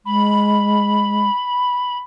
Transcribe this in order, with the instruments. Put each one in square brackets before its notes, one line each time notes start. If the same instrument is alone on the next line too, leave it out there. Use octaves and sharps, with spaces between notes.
[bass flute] G#3 [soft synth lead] B5